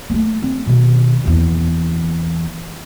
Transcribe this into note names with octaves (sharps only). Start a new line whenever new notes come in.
A3 A#3
C4
B2 D#3
F#1 E2